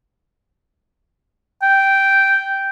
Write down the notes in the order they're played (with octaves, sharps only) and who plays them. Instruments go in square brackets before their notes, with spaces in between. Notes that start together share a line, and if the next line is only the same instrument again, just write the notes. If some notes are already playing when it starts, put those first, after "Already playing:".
[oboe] G5